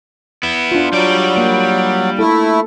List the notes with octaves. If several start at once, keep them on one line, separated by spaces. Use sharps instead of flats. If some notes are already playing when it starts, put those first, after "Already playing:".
B3 E4
D4 F4
F#3 G3 D5
A#3
A3 E4 A4